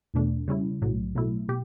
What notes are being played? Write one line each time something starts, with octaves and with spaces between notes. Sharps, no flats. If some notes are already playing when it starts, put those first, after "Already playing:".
E2 B2 A3 D4
C#3 G3 C#4 E4
B1 A2 F#3
B2 F#3 A3 E4
B2 G4